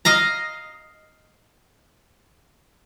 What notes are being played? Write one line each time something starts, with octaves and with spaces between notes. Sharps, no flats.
D#5 F5 A#5